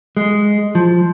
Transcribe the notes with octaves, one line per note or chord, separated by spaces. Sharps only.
G#3
F3